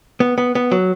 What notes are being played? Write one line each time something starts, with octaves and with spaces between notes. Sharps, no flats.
B3
B3
B3
F#3